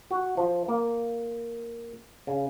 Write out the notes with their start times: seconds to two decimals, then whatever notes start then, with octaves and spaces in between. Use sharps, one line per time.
0.11 F#4
0.37 F3
0.68 A#3
2.27 C#3